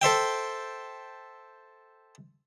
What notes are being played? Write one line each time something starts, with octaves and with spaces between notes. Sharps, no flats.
A4 C5 E5 G5